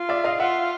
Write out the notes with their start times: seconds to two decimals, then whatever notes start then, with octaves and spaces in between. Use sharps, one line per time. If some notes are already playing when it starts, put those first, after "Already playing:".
Already playing: F4
0.09 D5 E5
0.24 D#5 F5
0.40 F4 E5 F#5